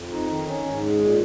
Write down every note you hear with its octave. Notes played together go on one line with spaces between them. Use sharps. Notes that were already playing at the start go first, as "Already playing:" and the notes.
Already playing: F2
D#4
D#3
C#4
G#2
G#3
A#2